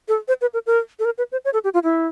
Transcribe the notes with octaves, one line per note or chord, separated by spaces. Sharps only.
A4
C5
B4
A#4
A#4
A4
A#4
B4
C5
C#5
A4
G4
F4
E4